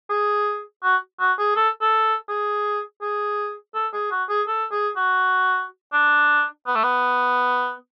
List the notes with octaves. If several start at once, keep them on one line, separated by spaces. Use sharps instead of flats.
G#4
F#4
F#4
G#4
A4
A4
G#4
G#4
A4
G#4
F#4
G#4
A4
G#4
F#4
D4
B3
A3
B3